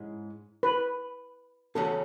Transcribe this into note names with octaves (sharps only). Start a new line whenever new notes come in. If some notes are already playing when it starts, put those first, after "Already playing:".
Already playing: G#2 G#3 C#4 E4
B4
E2 C#3 F#3 C#4 A4